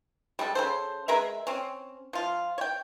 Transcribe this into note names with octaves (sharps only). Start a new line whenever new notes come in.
G3 G#3 A4
C#3 A4 C5
G#3 A#4 B4 E5
C4 C#4
F3 F4
C#5 G5